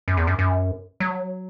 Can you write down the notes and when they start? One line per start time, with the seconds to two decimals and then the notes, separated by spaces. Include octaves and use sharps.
0.08 F#2
0.17 E2
0.27 F#2
0.39 F#2
1.00 F#3